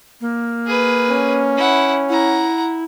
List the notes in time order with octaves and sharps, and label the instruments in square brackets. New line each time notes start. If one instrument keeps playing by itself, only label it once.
[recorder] A#3
[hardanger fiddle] G#4 B4
[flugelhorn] C#4
[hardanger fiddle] E4 F#5
[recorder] E4 [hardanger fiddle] F#5 A#5